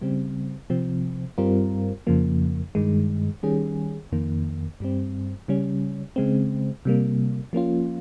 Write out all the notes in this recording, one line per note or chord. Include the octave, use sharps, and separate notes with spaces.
C#3 G3 C4
C3 F3 C4
G2 G3 C4 F4 A#4
F2 C#3 F3 A#3
G2 D#3 G#3
D#3 G3 C#4 G#4
F2 D#3 A#3
G2 G3 C4
C#3 G3 C#4
C#3 G#3 C4
C3 G3 A#3
F3 A#3 C#4 F4